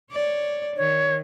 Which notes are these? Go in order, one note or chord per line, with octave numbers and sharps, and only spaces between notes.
C#5 D5
D#3 C#5